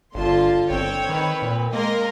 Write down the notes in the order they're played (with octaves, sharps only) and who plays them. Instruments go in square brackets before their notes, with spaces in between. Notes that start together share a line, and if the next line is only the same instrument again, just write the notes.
[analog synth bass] G1 [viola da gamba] D3 F4 [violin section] A5 C6
[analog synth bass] G1 [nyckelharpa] C4 [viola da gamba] C#5 [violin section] G5
[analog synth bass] D#3 [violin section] B4
[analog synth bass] A#2
[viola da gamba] G#3 [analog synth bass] A#3 [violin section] A#4 D#5 C6